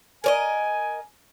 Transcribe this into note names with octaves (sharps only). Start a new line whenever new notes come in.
A#4 C#5 D#5 G#5